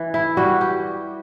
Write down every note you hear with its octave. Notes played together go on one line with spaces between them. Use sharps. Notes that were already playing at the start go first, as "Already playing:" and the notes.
Already playing: E3
E4
G3 F#4
G4